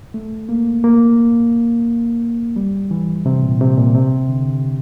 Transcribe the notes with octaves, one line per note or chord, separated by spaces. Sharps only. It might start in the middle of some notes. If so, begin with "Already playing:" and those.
A3
A#3
A#3
G3
E3
C3
A#2
C3
A#2
C3
D3